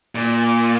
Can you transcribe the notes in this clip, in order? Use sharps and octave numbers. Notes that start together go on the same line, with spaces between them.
A#2